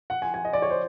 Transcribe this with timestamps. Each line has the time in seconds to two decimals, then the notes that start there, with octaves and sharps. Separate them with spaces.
0.10 F#5
0.22 G#5
0.34 G#5
0.45 D#5
0.53 D5
0.62 C#5
0.70 C5